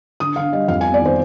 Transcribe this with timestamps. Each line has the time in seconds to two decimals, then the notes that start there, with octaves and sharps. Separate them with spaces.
0.20 D3 D#6
0.36 D3 F5
0.53 G3 D#5
0.68 F2 F5
0.81 G#5
0.85 B3
0.94 D5
1.01 D#3 C5